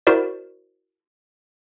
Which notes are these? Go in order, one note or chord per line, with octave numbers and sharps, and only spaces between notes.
E4 F#4 A#4 C5 D5